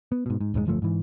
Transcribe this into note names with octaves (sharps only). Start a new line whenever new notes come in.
B3
G#2 B2
G#2
D#1 G#2 C3 G#3
D1 G1 F3 A3
G#2 E3